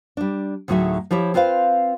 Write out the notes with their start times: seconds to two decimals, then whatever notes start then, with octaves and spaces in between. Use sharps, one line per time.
0.17 G3 D4
0.68 D2 A2 F#3 D#4 G#4 E5
1.11 F3 E4 G4 C#5
1.34 C4 F4 B4 C5 F5